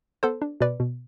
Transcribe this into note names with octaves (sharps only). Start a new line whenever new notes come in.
B3 A4 C5
D4
B2 B4 D5
B2